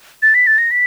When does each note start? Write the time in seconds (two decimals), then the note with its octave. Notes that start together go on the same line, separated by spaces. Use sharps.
0.22 A6
0.35 B6
0.47 A6
0.58 A#6
0.71 B6